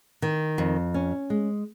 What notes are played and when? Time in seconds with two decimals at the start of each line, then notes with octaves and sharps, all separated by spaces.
0.22 D#3
0.58 F2
0.94 C#4
1.30 G#3